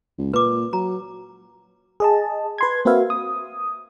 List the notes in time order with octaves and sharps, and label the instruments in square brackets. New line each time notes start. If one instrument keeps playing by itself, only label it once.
[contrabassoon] C#2
[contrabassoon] A#2 [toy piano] B4 D6
[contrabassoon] F#3 [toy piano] A#5
[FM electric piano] G#4 D#5 A5
B4 C6 G#6
A#3 C4 F#4 B4 E5 F5
D#6